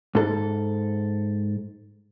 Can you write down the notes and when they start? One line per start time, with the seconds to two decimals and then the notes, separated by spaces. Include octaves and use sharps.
0.15 G#2 A4